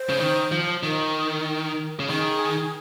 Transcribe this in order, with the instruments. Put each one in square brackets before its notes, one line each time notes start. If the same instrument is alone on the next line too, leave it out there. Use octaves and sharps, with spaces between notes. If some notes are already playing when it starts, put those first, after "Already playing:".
Already playing: [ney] C5
[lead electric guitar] C#3
D#3
F3
[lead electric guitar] D#3 [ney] A#4
[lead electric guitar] C#3
[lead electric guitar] D#3 [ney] G#4